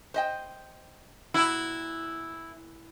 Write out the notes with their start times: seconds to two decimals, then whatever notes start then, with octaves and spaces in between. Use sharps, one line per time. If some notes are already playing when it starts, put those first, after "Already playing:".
0.14 C5 D#5 G5
1.34 A#2 E4 F#4